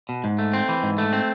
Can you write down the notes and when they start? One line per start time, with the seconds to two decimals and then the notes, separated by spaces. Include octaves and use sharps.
0.09 B2
0.24 G#2
0.39 A3
0.53 C4
0.69 E3
0.83 G#2
0.98 A3
1.13 C4